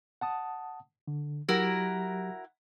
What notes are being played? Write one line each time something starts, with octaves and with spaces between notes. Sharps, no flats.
F#5 A5 D#6
D3
F#3 E4 F#4 G4 A#4